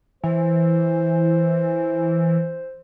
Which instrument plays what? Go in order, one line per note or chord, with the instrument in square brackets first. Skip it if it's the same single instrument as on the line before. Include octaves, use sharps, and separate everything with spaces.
[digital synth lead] E3 [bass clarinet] C5